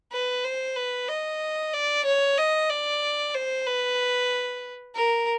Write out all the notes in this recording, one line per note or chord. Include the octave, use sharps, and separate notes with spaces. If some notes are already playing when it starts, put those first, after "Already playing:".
B4
C5
B4
D#5
D5
C#5
D#5
D5
C5
B4
A#4